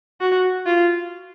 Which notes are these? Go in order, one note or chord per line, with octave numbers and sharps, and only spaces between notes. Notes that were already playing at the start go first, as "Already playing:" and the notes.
F#4
F4